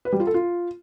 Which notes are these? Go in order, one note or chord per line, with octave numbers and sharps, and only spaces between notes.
B4
G3
F4
A4
F4